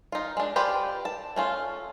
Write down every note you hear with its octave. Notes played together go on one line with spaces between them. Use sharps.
D#4 F4
G#3 D4
F4 G4 B4 C5 D5
A5
A3 C#4 F4